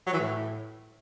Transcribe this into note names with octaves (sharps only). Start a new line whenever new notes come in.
F#3
E3
A2